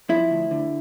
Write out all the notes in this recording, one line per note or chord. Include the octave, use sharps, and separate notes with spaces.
F3 E4
D2
D3